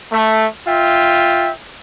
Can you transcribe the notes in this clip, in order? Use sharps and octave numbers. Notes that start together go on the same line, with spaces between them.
A3
F4 E5 G5